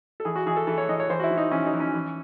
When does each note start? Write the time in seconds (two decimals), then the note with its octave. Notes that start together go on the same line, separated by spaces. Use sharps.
0.20 A4
0.25 E3 G#4
0.36 F#4
0.46 E3 G#4
0.56 A4
0.67 E3 A4
0.78 C#5
0.89 E3 D#5
1.00 C#5
1.10 E3 C5
1.20 F#4
1.24 E4
1.31 E3
1.37 D#4
1.52 E3 C#4
1.66 D#4
1.73 E3
1.80 C#4
1.94 E3